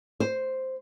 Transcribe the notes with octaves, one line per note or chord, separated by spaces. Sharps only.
C5